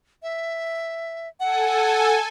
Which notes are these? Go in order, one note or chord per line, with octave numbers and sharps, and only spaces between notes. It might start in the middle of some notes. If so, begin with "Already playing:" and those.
E5
A4 F#5 G#5